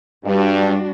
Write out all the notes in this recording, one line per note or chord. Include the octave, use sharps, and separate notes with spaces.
G2 G3 D4 F#4